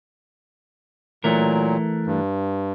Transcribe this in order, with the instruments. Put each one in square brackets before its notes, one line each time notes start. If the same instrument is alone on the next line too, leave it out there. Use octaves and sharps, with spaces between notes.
[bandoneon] A#2 F#3 [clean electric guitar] E3 A3 A#4
[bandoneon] G2